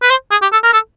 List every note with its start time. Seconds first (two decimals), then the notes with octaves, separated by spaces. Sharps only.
0.02 B4
0.10 C5
0.31 G#4
0.42 G4
0.52 A4
0.63 A#4
0.73 A4